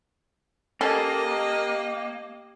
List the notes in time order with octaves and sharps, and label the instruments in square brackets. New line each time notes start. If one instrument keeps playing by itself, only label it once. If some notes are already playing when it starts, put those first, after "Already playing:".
[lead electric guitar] A#3 [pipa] C#4 A4 [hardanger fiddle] G4 D#5